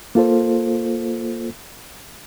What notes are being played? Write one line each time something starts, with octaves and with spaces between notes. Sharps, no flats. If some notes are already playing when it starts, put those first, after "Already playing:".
A#3 F4 A4 C5